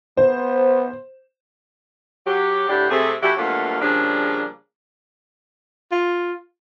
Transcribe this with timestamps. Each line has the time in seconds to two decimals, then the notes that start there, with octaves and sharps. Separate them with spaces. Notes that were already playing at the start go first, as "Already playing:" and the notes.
0.17 B3 C5
2.26 F#3 G4
2.68 A2 D3 D4 E4 G4
2.90 C3 A3 G#4
3.21 E3 A3 E4 F#4 G4
3.37 G2 B2 F#3 A3 A#3 F4
3.81 C#3 F3 G3 A#3 D4 G#4
5.91 F4